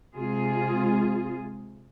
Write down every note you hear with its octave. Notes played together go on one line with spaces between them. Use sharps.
C3 G#3 F4 G#4